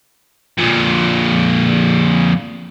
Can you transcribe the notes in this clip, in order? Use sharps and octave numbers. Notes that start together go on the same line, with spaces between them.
F2 A#2